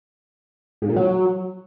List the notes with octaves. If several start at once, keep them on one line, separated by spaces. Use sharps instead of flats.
G#2
A#2
F#3